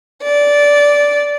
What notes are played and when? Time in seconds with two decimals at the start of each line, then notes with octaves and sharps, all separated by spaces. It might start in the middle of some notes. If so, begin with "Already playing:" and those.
0.23 D5